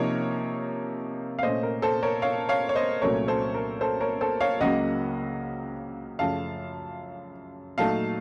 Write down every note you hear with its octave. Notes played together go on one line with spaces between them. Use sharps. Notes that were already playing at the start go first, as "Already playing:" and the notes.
Already playing: C3 F3 A#3 D#4 A#4 C#5
F5
A#2 A3 C#4 C5 D#5
A#4
A4 C5
A#4 C#5
C#5 F5
C#5 F5
C#5
C5 D#5
C2 A#2 F#3 A3 C#4 A#4 C#5
A4 C5
A#4
A4 C5
A#4 C#5
A4 C5
C#5 F5
C#2 C#3 F#3 A#3 D#5 F#5
F#2 C#3 F3 A3 F5 A5
A#2 F#3 A3 D#4 F5 A5